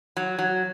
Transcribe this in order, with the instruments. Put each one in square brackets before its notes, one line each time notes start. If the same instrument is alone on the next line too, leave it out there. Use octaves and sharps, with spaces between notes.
[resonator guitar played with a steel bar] F#3
F#3